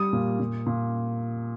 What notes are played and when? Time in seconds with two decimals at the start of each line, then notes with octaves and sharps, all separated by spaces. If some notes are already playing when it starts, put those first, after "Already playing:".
Already playing: G3 D#6
0.13 A#2
0.40 A#2
0.66 A#2